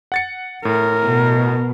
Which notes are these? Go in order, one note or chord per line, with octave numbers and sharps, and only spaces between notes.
F#5 A6 C#7
A2 A#4
B2